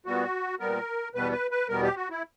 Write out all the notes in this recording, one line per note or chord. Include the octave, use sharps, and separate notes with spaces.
A#2 G3 B3 F#4
A#2 G3 B3 A#4
E2 B2 G3 B3 B4
B4
B4
E2 B2 G3 B3 A#4
G4
F#4
E4